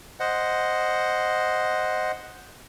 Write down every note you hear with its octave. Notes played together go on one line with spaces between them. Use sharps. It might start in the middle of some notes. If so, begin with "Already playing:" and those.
C5 D#5 F#5